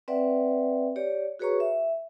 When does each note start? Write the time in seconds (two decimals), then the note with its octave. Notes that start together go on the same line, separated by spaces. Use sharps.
0.08 C4 B4 D5 E5 F#5 G5
0.96 G4 C#5 D5
1.39 F#4 G#4 B4 C#5 A#5 C#6
1.60 E5